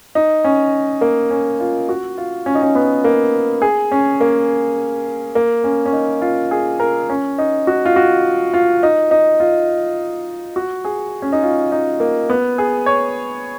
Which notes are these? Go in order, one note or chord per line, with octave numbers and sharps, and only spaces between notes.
D#4
C#4
A#3
C#4
F4
F#4
F4
C#4
D#4
C#4
B3
A#3
G#4
C#4
A#3
A#3
C#4
C#4
D#4
F4
G#4
A#4
C#4
D#4
F#4
F4
F#4
F4
D#4
D#4
F4
F#4
G#4
C#4
D#4
F4
D#4
A#3
B3
G#4
C#5